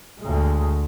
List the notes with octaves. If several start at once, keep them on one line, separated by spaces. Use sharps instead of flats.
D2 G#3